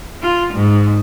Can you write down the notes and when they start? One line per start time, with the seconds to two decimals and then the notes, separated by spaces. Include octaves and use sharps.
0.22 F4
0.54 G#2